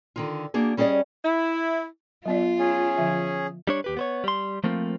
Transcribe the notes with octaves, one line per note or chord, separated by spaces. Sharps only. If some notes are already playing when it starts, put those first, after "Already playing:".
D3 D#3 F4
A#3 D4 F#4 G#4
G3 C#4 G#4 C5 D5 D#5
E4
F#3 B3 F4 D5
C#4 G#4
D3 F3 E5
G3 D4 C#5
D#2 G4 B4
B3 C5 C#5
G3 C6
F3 A3 A#3 C4 F4